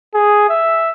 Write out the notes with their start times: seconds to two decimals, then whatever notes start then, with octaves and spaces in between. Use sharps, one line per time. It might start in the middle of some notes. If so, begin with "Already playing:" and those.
0.14 G#4
0.49 E5